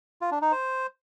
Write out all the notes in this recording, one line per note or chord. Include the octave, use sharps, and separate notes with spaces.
F4
D4
D#4
C5